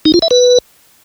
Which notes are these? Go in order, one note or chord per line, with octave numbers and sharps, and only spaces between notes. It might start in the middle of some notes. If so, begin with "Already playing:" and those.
D#4
F4
E5
B4